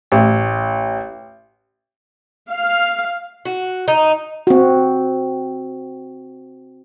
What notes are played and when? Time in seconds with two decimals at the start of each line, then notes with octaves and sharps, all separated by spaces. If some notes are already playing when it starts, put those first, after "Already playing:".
0.12 A1
2.50 F5
3.45 F#4
3.88 D#4
4.47 C4 F#4